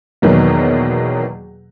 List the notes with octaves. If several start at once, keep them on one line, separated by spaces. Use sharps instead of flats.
E2 B2 D#3 F#3 A#3